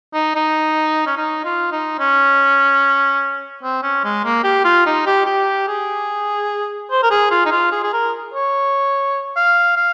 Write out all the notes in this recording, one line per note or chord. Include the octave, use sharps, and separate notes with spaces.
D#4
D#4
C#4
D#4
F4
D#4
C#4
C4
C#4
G#3
A#3
G4
F4
D#4
G4
G4
G#4
C5
A#4
G#4
F4
D#4
F4
G#4
G#4
A#4
C#5
F5
F5